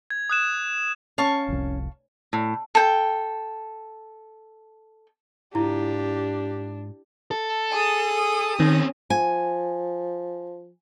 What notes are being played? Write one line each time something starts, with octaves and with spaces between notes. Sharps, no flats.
G#6
D#6 F#6 E7
C#4 F5 A5 C#6
F1 C2
A2
A4 G5
G#2 D4 E4 F4 G4
A4
G#4 D#6
D#3 C4 C#4
F3 G#5